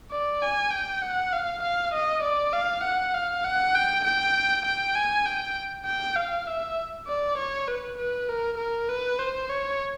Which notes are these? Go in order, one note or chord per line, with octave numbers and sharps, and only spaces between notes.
D5
G#5
G5
F#5
F5
F5
D#5
D5
F5
F#5
F5
F#5
G5
G5
G5
G#5
G5
G5
F5
E5
D5
C#5
B4
B4
A#4
A#4
B4
C5
C#5